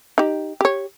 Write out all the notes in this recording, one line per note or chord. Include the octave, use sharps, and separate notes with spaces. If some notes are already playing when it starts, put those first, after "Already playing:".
D#4 G4
G4 C#5